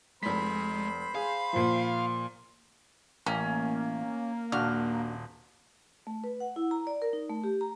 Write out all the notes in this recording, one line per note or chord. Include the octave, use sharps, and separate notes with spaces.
F1 G#3 C5 B5 B6
G#4 F5
A#2 F3
A1 A#3 C#4
D#1 D4 F#4 F6
A3
B4
F#5
E4
A#5
D5
A#4
D#4
A3
G4
A#5